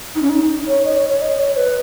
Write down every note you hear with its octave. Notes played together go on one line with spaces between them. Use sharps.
D#4
C#4
D#4
C#5
D#5
C#5
C#5
D#5
C#5
B4